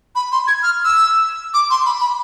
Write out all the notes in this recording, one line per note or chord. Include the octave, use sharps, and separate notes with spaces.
B5
C6
G#6
F6
E6
D6
C6
B5
B5